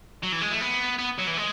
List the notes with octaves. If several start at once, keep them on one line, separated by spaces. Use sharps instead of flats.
F#3
E3
G#3
A3
B3
B3
F#3
E3
G#3